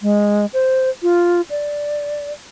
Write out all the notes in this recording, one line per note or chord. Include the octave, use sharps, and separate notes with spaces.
G#3
C5
F4
D5